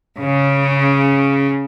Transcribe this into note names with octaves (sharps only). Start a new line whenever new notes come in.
C#3